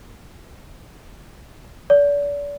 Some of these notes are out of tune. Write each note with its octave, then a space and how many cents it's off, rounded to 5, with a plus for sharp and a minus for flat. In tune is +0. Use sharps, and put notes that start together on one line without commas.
D5 -35